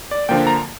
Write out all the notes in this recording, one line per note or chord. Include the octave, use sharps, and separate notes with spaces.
D5
D3 F3 A#3 G5
A#5